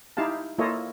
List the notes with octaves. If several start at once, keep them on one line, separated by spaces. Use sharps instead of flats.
D#4 E4 G4 F5 A5
A#3 E4 F4 A4 C#5 D#5